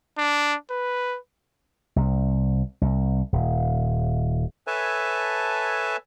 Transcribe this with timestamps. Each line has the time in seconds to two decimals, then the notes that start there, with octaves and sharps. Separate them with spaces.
0.18 D4
0.71 B4
1.96 C2
2.82 C2
3.33 D#1
4.67 A4 B4 C#5 E5 G#5 A5